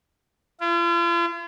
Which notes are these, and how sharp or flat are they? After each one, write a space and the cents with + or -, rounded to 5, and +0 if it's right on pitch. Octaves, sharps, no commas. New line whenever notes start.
F4 -45